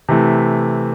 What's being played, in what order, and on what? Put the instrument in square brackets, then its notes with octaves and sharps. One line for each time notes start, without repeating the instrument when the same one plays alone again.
[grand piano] C3 E3 A3